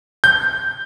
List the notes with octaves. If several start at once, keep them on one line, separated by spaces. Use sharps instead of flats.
G6